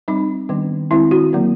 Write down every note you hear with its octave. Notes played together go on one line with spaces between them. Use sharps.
G3 C4 D#4
D#3 G3 B3 D4
D#3 G#3 C4 E4
F#4
D3 F#3 A#3